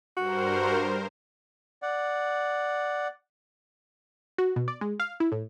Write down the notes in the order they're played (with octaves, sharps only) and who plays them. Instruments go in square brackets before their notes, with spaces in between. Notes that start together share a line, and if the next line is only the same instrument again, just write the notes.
[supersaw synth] G2 A#4 C5 [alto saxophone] F#4
[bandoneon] D5 F#5
[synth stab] F#4
B2
D5
G#3
F5
E4
A2